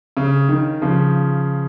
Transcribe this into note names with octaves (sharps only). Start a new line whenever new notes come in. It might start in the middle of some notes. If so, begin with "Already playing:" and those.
C#3
D#3
C#3 F3